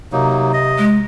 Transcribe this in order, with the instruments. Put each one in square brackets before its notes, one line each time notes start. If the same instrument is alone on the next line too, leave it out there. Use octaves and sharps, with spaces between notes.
[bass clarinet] C3 [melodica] F#3 A#3 D#4
[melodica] D#5
[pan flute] G#3